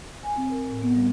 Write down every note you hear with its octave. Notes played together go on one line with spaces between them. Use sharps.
G#5
C4
A#4
A2
B3
G3